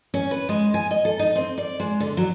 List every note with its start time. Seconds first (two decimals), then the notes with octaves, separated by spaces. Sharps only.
0.14 C#4
0.31 B4
0.49 G#3
0.74 G#5
0.91 D#5
1.05 A4
1.19 D#4
1.35 C4
1.58 D5
1.80 G#3
2.00 D3
2.17 F#3